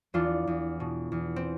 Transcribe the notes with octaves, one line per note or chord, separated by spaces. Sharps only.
E2 D4 F4
E2
B2
E2
C4